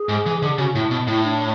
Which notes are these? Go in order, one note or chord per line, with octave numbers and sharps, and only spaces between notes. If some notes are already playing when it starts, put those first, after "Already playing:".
Already playing: G#4
G#2
E3
D3
G#4
C#3 F#4
A2 E4
B2
A2 E4
D4